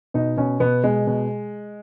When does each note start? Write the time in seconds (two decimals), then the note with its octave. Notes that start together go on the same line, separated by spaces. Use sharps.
0.14 B2 D#4
0.37 B2 C#4
0.60 B2 B3
0.84 B2 G#3
1.07 B2